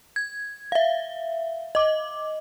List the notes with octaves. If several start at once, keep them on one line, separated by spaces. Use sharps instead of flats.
G#6
E5 F5
D#5 D6